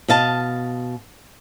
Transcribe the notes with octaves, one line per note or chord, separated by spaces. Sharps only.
B2 D#5 F5 A5